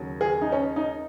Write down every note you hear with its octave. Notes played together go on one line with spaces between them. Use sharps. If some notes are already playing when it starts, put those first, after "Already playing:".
Already playing: D#2 C#3 F#3
G#4
D#4
C#4
D#4